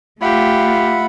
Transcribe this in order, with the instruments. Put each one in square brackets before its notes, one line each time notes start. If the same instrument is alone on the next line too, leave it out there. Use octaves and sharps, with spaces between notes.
[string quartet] A3 F4 [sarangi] G4 [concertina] E5 F#5 B5